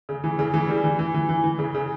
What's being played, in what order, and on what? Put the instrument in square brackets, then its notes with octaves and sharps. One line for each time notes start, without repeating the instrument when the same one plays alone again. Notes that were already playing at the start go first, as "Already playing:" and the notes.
[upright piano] C#3
E3
C#3
E3
G3
E3
E3
E3
E3
E3
C#3
C#3